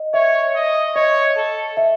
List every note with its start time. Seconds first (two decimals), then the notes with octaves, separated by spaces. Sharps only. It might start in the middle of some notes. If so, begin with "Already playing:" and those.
Already playing: D#5
0.14 C#5 E5
0.55 D#5
0.96 C#5 D#5
1.37 A4
1.77 E5